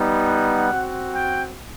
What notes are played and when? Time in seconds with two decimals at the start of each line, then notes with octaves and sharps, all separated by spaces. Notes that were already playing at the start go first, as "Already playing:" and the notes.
Already playing: G3 B3 D#4
0.27 F#5
0.71 C4 F#4
1.14 G5